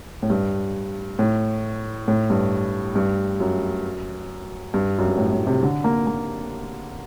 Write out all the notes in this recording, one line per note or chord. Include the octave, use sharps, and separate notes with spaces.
A2
G2
A2
A2
G2
G2
F#2
G2
F#2
G2
A2
A2
C3
D3
A#3
A#3